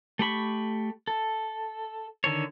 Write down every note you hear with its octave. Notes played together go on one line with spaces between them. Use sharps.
A3 G4 B5 C#6
A4
D3 D#3 A4 C#5